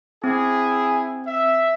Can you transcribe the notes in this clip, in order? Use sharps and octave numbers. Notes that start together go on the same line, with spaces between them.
C4 E4 G#4 G#5
E5